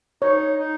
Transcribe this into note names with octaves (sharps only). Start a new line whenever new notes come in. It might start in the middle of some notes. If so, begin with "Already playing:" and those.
D#4 C#5
D#4